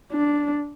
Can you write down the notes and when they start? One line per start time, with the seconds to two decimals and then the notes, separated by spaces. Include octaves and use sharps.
0.12 D4